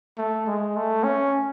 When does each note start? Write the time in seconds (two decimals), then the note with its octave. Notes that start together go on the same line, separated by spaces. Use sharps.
0.18 A3
0.47 G#3
0.76 A3
1.04 C#4